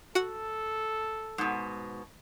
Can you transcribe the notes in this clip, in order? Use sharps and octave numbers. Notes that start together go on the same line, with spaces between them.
F#4 A4 F#5
G#2 B2